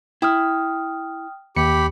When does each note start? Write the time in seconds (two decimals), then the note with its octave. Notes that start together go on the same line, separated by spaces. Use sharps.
0.22 E4 G5 D#6 F6
1.57 D#2 G4 B5 C#7